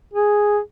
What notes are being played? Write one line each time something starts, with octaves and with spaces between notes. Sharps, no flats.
G#4